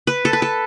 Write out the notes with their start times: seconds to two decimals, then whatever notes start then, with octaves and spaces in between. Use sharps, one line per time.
0.07 B4
0.25 A4
0.33 B4
0.42 A4